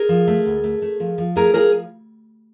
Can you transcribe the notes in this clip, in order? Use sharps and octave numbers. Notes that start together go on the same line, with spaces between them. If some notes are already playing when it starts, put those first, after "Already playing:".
Already playing: G#4 A#4
F3
A3
D2
A3
A3
F3
F3
A3 G#4 A#4
F3 G#4 A#4